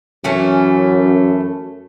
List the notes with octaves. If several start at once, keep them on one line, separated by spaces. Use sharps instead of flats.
F#2 E3 A3 C#4